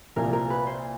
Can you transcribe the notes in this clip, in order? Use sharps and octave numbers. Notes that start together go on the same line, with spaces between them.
C2 A#2 F3 A#4
A#4
B4
C5